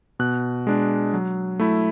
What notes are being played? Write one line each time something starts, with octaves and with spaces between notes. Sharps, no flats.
B2 F#6
G#3 D4
F#3
A3 E4